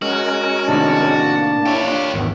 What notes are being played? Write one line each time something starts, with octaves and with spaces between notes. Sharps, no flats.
G#3 C#4 F#4 A#4
A2 C3 D#3 D4 A5
A#3
E4 G4 C#5
D4 F4
G#1 E2